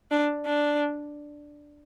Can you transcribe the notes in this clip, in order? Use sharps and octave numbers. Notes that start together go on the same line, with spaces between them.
D4
D4